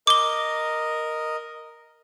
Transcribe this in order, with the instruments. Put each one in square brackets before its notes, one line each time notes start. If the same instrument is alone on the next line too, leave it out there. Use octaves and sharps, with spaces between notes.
[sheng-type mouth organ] A#4 D#5 [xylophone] D6 G7